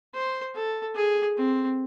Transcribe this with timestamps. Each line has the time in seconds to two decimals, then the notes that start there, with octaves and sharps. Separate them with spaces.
0.14 C5
0.55 A4
0.95 G#4
1.37 C4